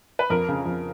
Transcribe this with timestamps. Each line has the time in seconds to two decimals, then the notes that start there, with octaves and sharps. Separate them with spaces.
0.19 B4
0.30 F2 A#4
0.48 C#3
0.65 F2